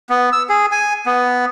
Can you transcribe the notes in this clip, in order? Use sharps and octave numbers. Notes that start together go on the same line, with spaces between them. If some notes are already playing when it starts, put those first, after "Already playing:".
B3
E6
G#4
G#5
B3